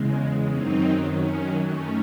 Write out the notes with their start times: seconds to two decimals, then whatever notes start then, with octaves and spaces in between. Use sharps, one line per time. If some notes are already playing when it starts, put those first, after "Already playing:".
Already playing: E2 C#3 G#3
0.53 F#2 D#3 F#3 C4 D#4
1.09 C#4
1.64 F#2 D#3 A3 C#4